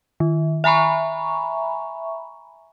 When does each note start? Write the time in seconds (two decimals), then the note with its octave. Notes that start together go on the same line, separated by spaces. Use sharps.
0.20 D#3
0.64 E5 G#5 A#5 B5 C#6